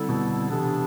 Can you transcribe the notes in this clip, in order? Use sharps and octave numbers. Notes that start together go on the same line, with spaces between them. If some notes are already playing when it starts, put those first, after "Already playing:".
Already playing: D3 G3 C4 E4 A4
B2
C3 E3 B3 D4 A4